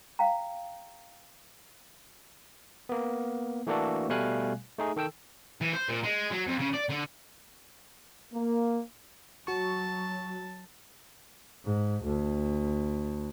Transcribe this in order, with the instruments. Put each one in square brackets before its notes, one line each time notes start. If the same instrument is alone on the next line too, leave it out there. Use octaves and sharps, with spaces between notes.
[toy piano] F5 G5 A#5
[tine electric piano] A#3 B3
E3 A3 A#3 D4 F#4 A4
B2 G3 A3 F5 G#5 F#6
A3 D#4 G#4
D#3 A4 G5 E6
[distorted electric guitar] E3
C5
A#2
G#3
F#3
F2
C#3
D5
D3
[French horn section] A#3
[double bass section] F#3 [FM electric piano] F#4 C#6 [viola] A5
[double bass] G#2
D2